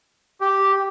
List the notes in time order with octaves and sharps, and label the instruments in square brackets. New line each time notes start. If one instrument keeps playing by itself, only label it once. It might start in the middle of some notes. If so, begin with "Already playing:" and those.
[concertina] G4